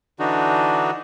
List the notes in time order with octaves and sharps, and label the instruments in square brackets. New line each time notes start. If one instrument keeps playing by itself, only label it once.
[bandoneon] D3 E3 D4 D#4 F#4